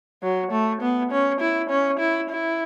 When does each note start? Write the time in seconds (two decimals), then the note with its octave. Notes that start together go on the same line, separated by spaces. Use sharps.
0.23 F#3
0.52 A3
0.82 B3
1.11 C#4
1.41 E4
1.70 C#4
1.99 E4
2.29 E4